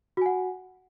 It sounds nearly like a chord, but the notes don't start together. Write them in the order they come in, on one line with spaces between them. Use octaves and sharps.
F#4 G#5 F#5